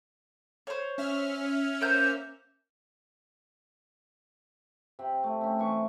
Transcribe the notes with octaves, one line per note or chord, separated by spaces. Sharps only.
C5 C#5
C#4 E5 F6
A#3 C5 G6
C3 C4
A3
C4 C#4
E3 C#6